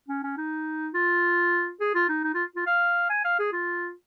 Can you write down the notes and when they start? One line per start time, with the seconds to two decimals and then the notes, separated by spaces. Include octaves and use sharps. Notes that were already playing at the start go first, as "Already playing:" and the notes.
0.08 C#4
0.23 C#4
0.37 D#4
0.94 F4
1.80 G#4
1.95 F4
2.09 D#4
2.24 D#4
2.34 F4
2.55 F4
2.66 F5
3.10 G#5
3.24 F5
3.39 G#4
3.52 F4